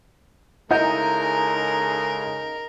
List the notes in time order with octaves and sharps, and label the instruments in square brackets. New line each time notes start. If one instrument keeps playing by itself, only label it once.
[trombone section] C#3 G#3 A4 [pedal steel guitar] D#4 [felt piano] E4 D#5 G6 [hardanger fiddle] A#4